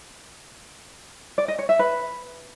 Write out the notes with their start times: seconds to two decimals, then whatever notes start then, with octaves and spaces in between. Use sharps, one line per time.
1.38 D5
1.48 D#5
1.59 C#5
1.69 E5
1.79 B4